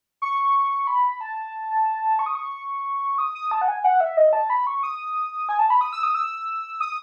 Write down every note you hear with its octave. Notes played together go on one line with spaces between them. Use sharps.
C#6
B5
A5
C#6
D#6
C#6
D#6
D#6
A5
F#5
G#5
F#5
E5
D#5
A5
B5
C#6
D#6
G#5
A5
B5
D#6
E6
D#6
E6
D#6